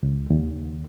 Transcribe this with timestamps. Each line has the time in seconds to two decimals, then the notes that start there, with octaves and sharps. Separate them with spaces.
0.03 C#2
0.30 D#2